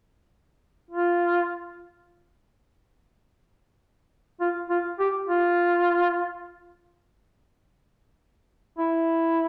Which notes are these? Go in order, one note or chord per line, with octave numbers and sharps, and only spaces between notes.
F4
F4
F4
G4
F4
E4